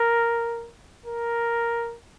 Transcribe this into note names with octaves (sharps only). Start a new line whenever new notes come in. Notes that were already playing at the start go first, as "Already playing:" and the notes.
Already playing: A#4
A#4